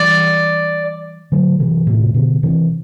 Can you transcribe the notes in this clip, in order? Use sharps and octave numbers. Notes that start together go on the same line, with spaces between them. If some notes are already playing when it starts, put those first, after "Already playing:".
Already playing: E3 G3 D5
D3 F#3
C3 E3
A2 C3
C3
B2 D3
C3 E3